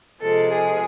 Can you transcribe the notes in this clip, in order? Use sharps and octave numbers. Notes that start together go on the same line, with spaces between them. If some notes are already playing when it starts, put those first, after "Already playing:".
C3 F3 G#3 A4
G#4